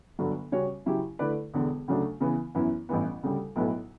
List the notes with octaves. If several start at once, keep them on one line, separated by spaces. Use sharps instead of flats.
G1 G2 D3 F#3
C#3 G3 C#4 F#4 C#5
C#3 F#3 C#4 E4 G4
D3 A3 E4 B4 D5
E1 E2 D3
D2 C#3 F#3 A3 D4
C#3 E3 B3
F#2 E3 B3 E4
A1 G2 E3 B3
D2 C#3 G3
B1 A2 F#3 B3 E4